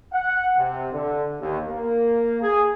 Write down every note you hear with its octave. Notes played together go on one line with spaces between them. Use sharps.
F#5
C3
D3
D#2
A#3
G#4